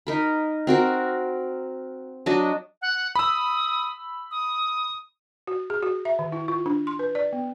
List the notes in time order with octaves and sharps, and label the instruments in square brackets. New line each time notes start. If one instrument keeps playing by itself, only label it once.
[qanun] D#4 A#4 B5
C4 F#4 A#4
F#3 D4 F#4 D#5
[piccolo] F#5
[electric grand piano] B5 E6 [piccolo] D#6
[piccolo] D#6
[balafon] F#4
G#4
F#4
E5
D#3
E4
F4
D4
C6
B4
D5
B3